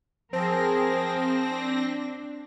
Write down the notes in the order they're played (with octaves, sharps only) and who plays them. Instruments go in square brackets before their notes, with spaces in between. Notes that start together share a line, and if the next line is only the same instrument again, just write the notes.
[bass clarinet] F3 [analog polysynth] C4 A#6 [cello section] G#4 A#4
[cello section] D4